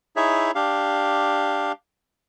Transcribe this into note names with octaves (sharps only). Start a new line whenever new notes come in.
D#4 E4 G#4 C#5 E5
D4 G4 F5